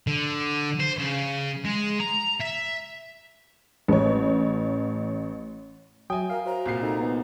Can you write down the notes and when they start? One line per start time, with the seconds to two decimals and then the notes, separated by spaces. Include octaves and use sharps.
0.07 D3
0.80 C5
0.99 C#3
1.65 G#3
2.00 A#5
2.40 E5
3.88 A1 C#5
6.10 F#3 E5 G5 G#5 D#6
6.30 A#4 F5
6.45 F#4 C5 C#5 A#5
6.65 C2 A#2 C7
6.83 D#4 A4
7.01 B3 D#4